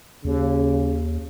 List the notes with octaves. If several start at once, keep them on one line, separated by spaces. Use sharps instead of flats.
D#2 C#3